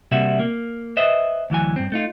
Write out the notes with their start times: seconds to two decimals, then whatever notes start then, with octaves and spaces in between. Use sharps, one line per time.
0.12 C3 G3 A#3 F#4 E5
0.39 A#3
0.97 B4 C5 D#5 E5
1.50 D2 E3 F#3 G#5
1.76 G2 C4
1.92 A3 D#4 F4